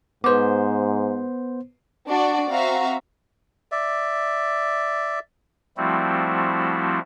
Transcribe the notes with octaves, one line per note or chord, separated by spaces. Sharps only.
G#2 B3 B4 C5 D6
D4 F#4 D5 F#5
C4 F#4 E5 F5 A#5
D5 E5
F3 G3 A3 C4 E4 F#4